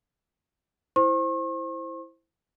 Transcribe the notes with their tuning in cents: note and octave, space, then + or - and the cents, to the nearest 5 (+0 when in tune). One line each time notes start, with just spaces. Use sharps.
E4 +0 C5 +0 C#6 -45